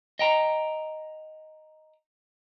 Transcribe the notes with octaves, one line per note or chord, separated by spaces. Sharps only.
D#5 G5 A#5